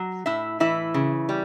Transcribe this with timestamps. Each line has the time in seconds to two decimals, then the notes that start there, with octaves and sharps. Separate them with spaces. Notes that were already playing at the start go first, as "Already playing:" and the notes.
Already playing: F#3
0.26 A2 E4 E5
0.60 E3 E4 E5
0.94 C#3
1.29 G3